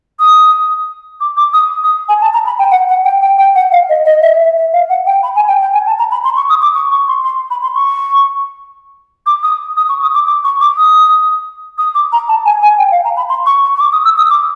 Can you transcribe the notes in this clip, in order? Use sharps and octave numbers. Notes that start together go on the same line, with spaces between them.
D#6
D6
D6
D#6
D#6
G#5
A5
A#5
B5
G5
F#5
F#5
G5
G5
G5
F#5
F5
D#5
D#5
E5
E5
E5
F5
F#5
G5
B5
G#5
G5
G5
G#5
A5
A#5
B5
C6
C#6
D#6
D6
C#6
C#6
C6
C6
B5
C6
C#6
D6
D#6
D#6
C#6
D#6
D6
D6
C#6
D6
D#6
D#6
D6
A#5
A5
G#5
G#5
G5
F5
A#5
B5
C6
C#6
C#6
C#6
D6
D#6
E6
D#6
D6